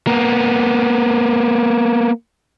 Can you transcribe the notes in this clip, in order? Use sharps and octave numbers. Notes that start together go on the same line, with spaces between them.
A#3 B3